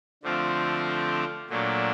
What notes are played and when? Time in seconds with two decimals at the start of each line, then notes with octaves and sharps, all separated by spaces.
0.23 D3 F3 A3 C4 F4
1.50 A#2 F#3 A3 D4